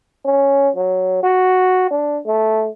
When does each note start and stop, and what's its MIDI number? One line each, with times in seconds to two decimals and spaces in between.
0.25 0.70 61
0.76 1.19 54
1.23 1.91 66
1.91 2.19 62
2.26 2.68 57